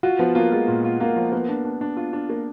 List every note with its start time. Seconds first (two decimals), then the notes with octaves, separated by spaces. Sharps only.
0.03 F4 F#4
0.19 F3 B3
0.35 A#3 F4
0.52 G#3 F4
0.68 A#2
0.84 F4
1.00 A#3 F4
1.16 F3
1.32 A#3 B3
1.49 D4
1.65 D4
1.81 D4
1.97 F4
2.13 D4
2.29 A#3